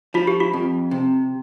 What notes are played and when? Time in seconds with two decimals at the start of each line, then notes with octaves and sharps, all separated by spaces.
0.14 F3 F4
0.27 G4
0.40 F4
0.53 F2
0.91 C3